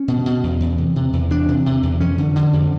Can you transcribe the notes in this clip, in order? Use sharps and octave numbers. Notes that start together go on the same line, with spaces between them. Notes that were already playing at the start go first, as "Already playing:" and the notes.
Already playing: C#4
B2
B2
E2
E2
C3
C3
E2
E2 D4
C3
C3
E2
F2 C#4
D3
D3
F2